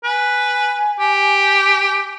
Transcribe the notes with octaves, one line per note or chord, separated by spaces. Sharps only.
B4 G#5
G4